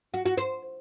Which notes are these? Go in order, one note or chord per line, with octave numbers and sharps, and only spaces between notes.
F#4
F#4
C5